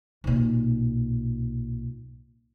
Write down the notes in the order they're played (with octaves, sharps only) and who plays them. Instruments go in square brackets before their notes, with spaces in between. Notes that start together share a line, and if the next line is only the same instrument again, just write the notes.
[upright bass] B1 A#2